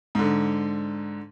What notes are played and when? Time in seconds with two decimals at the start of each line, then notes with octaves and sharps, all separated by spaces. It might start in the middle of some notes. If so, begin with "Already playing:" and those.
0.15 G#2 D3